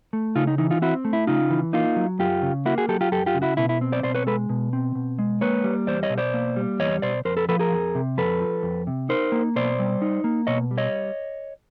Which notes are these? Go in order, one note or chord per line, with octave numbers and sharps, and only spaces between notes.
A3
C#3 D#4 F4
D#4
E3 D#4
D#4 F4
C4 E4 F#4
A3
E4
C#3 D#4 F4
E3
A#3 D#4 F4
F#3
F#2 F4 G4
C#3
A#3 E4 F#4
F#4 G#4
F#3 G4 A4
F4 G4
F#2 G4 A4
F4 G4
C#3
E4 F#4
B2 E4
E4
C4
C5 D5
B2 C5 D5
B4 C#5
G#3 A4 B4
B2
C4
B2
G#3
A#3 B4 C#5
G3
E2 C5 D5
C#5 D#5
B2
C5 D5
A#3
G3
E2 C#5 D#5
B2 C5 D5
F2 A#4 C5
A4 B4
F3 A4 B4
G#4 A#4
F2
C3
F2 A4 B4
F3
F2
C3
D#4 A#4 C5
A#3
B2 C5 D5
G3
D#4
A#3
B2 C#5 D#5
G3
C#5 D#5